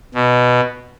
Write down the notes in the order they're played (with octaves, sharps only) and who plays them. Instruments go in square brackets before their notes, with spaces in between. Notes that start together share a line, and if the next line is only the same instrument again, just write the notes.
[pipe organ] B2